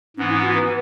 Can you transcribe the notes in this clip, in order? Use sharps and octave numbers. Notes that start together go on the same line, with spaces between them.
G#2 E3 B3 C#4
E4
F#4
B4